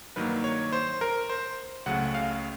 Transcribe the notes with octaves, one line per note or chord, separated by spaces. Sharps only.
G2 D#3 F#3 A#3 B4
C#5
C5
A#4
C5
C#2 C#3 F#3 A3 C#4 F#5
F5